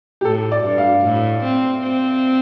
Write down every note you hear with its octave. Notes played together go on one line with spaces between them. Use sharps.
G4
A2 A4
D5
G2
F5
A2
C4
C4